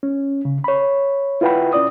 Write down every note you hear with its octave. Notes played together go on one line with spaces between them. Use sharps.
C#4
C#3
C#5 B5
E4 F4 B4 F#5 G5 B5
C2 C#4 D5 D#6